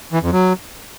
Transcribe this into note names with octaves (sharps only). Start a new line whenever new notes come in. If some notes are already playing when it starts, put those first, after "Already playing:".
E3
F2
F#3